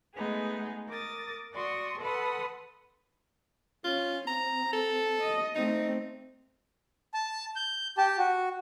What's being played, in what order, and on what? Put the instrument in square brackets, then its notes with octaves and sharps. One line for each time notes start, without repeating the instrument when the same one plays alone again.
[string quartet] G#3 A3 B3 D#4 G#4
A#4 D6 D#6 A6
F#4 D5 C6 C#6 D#6
A4 B4 F#5 B5 C6 D#6
[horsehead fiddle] C#4 [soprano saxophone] F4
[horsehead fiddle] C4 [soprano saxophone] A#5
[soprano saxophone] A4
[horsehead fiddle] D#5
[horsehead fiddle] A3 C4 [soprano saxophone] D#4
[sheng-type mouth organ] A5
G6
G4 A5
F#4